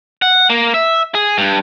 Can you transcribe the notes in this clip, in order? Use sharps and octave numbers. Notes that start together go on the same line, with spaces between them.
F#5
A#3
E5
G#4
G2